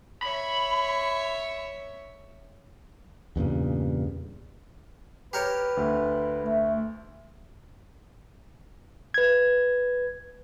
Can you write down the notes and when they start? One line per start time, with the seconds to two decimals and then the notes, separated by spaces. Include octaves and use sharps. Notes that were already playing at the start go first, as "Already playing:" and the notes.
0.23 C#5 E5 B5
3.36 E2 G2 A#2 C#3
5.33 G4 A#4 B4 C#5
5.77 D2
6.40 A3
9.14 B4 G#6